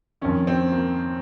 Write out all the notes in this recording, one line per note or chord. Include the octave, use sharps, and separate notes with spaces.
F2 D#3 C#4
C4
A#3